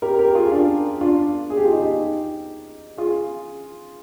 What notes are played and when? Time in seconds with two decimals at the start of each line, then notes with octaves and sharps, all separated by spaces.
0.02 G4 A#4
0.19 G4 A#4
0.35 F4 G#4
0.51 D4 F4
1.01 D4 F4
1.50 G#4
1.57 G4
1.65 F4
1.72 D#4 G4
2.98 F4 G#4